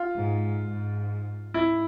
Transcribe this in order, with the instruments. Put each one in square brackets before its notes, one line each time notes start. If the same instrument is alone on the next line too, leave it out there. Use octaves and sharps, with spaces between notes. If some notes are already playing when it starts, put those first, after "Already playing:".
Already playing: [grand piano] F4
[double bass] G#2
G#2
[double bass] G#2 [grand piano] E4